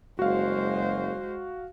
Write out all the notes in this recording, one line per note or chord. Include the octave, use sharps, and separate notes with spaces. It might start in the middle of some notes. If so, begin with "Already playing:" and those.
F#1 G#3 F#4 C5 F5